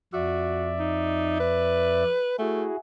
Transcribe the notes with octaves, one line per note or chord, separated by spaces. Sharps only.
F2 F#4 D5 E5
D#4
B4
A3 E4 F#4 G#4